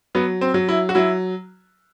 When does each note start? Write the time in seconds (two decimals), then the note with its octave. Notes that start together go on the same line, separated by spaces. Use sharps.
0.15 F#3 B3
0.41 C4
0.54 F#3
0.69 E4
0.89 F#4
0.95 F#3 E4